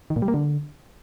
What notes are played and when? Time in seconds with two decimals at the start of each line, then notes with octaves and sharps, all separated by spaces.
0.10 D#3
0.16 A#2
0.22 G3
0.28 A#3
0.34 D3